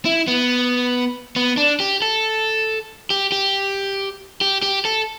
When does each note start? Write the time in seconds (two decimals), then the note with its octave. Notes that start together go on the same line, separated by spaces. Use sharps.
0.05 E4
0.28 B3
1.36 B3
1.57 D4
1.80 G4
2.02 A4
3.10 G4
3.32 G4
4.41 G4
4.62 G4
4.85 A4